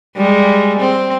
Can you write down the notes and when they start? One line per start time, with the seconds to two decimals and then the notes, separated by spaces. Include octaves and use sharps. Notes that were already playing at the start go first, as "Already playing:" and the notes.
0.16 G3 G#3
0.79 C4